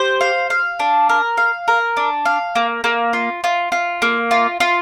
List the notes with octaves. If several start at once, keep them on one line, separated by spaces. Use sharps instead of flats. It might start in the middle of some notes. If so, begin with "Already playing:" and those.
Already playing: G4 C5
F5
F5
D4
A#4
F5
A#4
D4
F5
A#3
A#3
F4
F4
F4
A#3
F4
F4